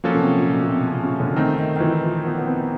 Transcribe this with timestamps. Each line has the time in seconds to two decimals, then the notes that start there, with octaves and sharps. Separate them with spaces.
0.04 F3 F#3 A#3 C#4 F#4 A4
0.14 C#3
0.20 C3
0.38 A#2
0.54 B2
0.70 C3
0.87 C#3
1.03 C#3
1.20 D3
1.36 D#3 A3 C4 D#4
1.59 D#3
1.76 D#3
1.80 E3
2.02 F3
2.24 B3
2.38 B3
2.46 C4